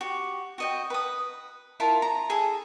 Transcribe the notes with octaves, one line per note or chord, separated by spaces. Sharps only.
F#4 G4
F#4 D#5 G5
B4 D#6
E4 F4 A#4 A5
A#5
G#4 A4